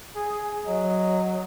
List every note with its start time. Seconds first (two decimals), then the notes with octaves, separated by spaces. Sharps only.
0.15 G#4
0.66 F#3 D#5